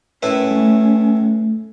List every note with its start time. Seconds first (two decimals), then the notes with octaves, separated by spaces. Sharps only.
0.23 A2 C#4 E4 B4
0.51 A3